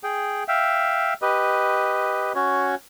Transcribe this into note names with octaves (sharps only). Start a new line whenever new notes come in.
G#4 G5
E5 F5 G5
G4 B4 D#5
C#4 F#4 C#5